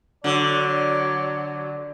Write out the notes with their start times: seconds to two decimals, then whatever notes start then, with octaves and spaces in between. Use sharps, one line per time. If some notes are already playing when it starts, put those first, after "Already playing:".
0.24 D3 F#3 D5